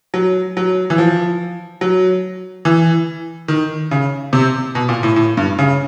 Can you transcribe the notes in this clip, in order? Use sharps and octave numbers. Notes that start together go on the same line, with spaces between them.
F#3
F#3
E3
F3
F#3
E3
D#3
C#3
C3
B2
A#2
A2
A2
G2
C#3